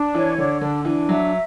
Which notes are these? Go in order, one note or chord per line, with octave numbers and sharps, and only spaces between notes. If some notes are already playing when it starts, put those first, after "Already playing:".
Already playing: D4
E3 C#5
D3 D4
D3 D4
E3 D4
F#3 E5